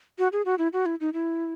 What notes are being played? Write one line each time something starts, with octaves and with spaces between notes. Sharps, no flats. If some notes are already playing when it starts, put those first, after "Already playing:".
F#4
G#4
F#4
E4
F#4
E4
D#4
E4